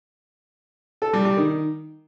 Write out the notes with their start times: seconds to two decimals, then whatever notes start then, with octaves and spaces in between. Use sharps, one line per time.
1.02 A4
1.13 G3
1.25 G3
1.37 D#3